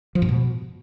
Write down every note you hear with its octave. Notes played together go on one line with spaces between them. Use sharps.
F3
G#2
B2